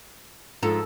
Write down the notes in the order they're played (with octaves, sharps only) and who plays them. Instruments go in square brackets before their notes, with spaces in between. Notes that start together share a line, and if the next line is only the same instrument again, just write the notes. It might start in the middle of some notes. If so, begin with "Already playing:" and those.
[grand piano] G#2 F3 [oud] A4